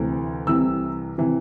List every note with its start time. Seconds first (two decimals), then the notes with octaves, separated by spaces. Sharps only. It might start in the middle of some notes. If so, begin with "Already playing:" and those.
Already playing: D2 C3 E3
0.47 C2 C3 E3 E6
1.18 C3 E3